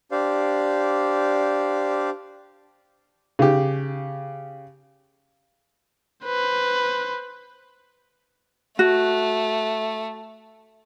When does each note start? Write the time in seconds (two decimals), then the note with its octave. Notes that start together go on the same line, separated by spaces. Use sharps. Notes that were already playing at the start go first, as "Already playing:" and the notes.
0.11 D4 G4 C5 D5 F5
3.39 C#3 G4
6.25 B4 C5
8.79 A3 F#4